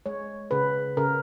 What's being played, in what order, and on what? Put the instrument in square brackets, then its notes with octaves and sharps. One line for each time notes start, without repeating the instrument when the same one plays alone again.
[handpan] G#3 C#5
C#3 B4
C#3 A#4